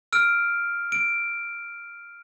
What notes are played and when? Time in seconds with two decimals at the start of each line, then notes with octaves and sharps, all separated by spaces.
0.13 E6 F6 D7
0.92 D7